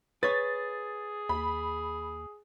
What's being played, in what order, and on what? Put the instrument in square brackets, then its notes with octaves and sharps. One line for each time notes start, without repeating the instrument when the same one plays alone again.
[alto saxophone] G#4 [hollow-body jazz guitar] B4 C#5 [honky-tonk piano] A6
[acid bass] D#2 [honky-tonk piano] B5